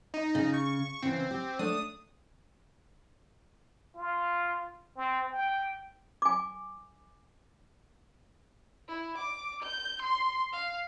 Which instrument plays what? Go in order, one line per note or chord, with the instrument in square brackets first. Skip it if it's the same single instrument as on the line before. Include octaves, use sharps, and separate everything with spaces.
[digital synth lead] D#4
[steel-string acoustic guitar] C#3
[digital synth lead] C#6
[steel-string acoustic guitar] C#3 E3 [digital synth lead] C4
[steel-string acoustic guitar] G4
[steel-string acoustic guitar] A3 D4 [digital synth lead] D#6
[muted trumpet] F4
C4
G5
[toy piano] G#5 D6
[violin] E4
D6
G6
C6
F5